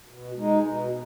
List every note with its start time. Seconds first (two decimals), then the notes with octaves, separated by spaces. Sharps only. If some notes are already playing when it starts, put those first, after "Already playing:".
0.08 B2
0.36 G#3 D#4
0.65 B2